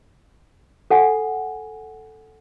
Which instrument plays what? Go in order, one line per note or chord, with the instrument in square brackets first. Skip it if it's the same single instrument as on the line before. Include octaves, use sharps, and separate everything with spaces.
[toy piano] A4 F#5 G#5